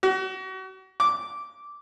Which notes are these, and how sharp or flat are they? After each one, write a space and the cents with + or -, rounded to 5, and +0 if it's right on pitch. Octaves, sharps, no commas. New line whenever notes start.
F#4 +35
D6 -10